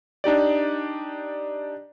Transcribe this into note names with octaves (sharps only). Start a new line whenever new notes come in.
D4 D#4 G4 D5